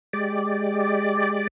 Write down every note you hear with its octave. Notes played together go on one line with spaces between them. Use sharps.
G#3 G4 D5